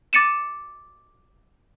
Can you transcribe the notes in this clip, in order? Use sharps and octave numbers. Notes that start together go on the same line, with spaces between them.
D6 A6 C#7 D#7 E7